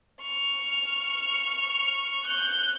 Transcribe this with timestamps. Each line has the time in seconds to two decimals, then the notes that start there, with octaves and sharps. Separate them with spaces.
0.22 C#6 F6
2.25 F#6 G6